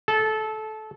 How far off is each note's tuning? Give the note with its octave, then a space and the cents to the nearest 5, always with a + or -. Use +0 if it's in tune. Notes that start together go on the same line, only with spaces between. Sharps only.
A4 -20